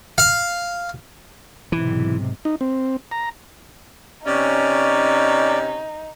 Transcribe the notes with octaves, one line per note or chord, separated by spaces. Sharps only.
F5
B1 G#2 C3 E3
D#4
C4
A#5
C3 C#4 D#4 D5